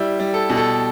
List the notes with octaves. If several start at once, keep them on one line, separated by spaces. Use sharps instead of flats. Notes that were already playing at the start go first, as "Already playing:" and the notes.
Already playing: G3 E4
G3
A4
B2
A4